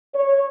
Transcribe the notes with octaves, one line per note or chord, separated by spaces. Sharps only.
C#5